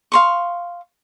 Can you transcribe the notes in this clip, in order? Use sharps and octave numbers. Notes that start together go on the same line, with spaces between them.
F5 C6 C#6